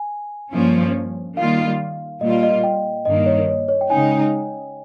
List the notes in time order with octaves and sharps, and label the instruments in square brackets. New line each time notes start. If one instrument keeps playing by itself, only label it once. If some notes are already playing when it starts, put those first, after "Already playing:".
Already playing: [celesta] G#5
[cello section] G2 F3 A#3 C#4
[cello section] D#3 G3 A#3 F4 [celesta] F5
[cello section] A#2 G3 A#3 F4 [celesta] D#5
[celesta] D#5
G5
[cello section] G2 D#3 A#3 [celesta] D#5
[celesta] C#5
C#5
C#5
G5
[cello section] C#3 G#3 D#4 [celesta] G#5